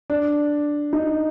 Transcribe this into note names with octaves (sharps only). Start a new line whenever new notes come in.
D4
D#4